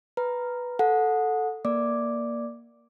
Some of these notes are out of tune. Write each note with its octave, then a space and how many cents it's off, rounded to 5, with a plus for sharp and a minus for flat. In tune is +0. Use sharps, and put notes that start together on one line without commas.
B4 +0 A#5 +0
A4 +0 F#5 -25
A#3 +5 D5 +0 D6 +0